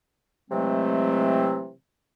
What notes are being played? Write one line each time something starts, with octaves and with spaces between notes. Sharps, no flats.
C3 E3 F#3 G#3 A3 C4